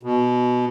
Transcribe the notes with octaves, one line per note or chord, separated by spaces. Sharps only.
B2